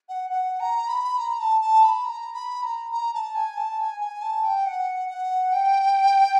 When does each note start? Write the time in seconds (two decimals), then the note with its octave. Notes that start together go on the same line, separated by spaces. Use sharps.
0.09 F#5
0.31 F#5
0.60 A#5
0.88 B5
1.18 A#5
1.40 A5
1.61 A5
1.83 B5
2.05 A#5
2.34 B5
2.63 A#5
2.92 A#5
3.14 A5
3.35 G#5
3.57 A5
3.79 G#5
4.01 G#5
4.22 A5
4.44 G5
4.66 F#5
5.09 F#5
5.53 G5